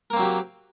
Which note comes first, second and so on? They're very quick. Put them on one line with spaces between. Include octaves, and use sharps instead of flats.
A#4 A#3 C4 F#3 G4